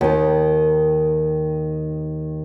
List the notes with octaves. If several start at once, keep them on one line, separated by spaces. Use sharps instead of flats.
D#2 D#3